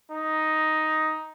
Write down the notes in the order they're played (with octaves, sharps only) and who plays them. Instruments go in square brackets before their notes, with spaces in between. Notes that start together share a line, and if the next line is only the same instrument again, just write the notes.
[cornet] D#4